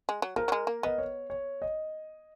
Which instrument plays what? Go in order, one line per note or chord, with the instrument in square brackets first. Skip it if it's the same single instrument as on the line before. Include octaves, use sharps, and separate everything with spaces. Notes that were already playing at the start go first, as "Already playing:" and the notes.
[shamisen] G#3
F#3
[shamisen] F3 [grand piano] A#4
[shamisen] F#3
G#3
A#3
[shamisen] B3 [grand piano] D#5
[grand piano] C#5
C#5
D#5